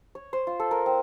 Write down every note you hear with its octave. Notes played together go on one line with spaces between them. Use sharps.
C#5
C5
F4
A4
A#4
C4